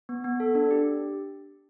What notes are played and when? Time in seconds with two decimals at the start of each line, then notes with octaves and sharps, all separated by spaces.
0.09 B3
0.24 B3
0.40 A4
0.55 D4
0.71 G4